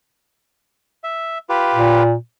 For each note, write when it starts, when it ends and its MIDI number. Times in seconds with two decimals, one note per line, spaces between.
1.04 1.38 76
1.49 2.03 65
1.49 2.03 67
1.49 2.03 71
1.75 2.14 46